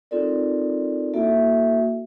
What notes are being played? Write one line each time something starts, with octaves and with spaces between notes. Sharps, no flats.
C4 D#4 F4 A4 A#4 D5
A#3 E4 F#4 A4 E5